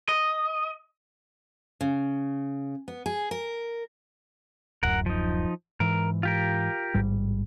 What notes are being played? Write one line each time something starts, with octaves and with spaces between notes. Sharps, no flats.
D#5
C#3
B3
G#4
A#4
D1 F#2 A#4 F#5
F3 D#4
G#2 E3 A#4
F4 G4 A#4
A1 G#2 G3